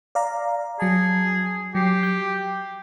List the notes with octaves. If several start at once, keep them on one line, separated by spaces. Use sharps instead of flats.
D5 F5 A#5
F#3 G#4 A5
F#3 G4 C7
G6